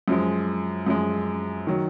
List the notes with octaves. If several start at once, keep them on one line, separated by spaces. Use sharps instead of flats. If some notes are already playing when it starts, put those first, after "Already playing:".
F#2 F3 G#3
F#2 F3 G#3
D#3 F#3